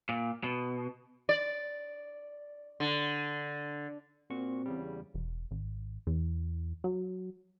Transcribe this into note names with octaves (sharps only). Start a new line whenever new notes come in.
A#2
B2
D5
D3
A#2 C4 F#4 C#6
E2 C#3 G3
E1
G#1
E2
F#3